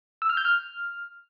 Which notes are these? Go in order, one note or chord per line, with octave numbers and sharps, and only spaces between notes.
E6
F6
G6
F6